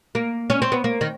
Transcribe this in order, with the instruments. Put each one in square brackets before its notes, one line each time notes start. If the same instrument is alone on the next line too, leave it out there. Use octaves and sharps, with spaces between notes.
[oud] A#3
C#4
C4
B3
A#3
D#3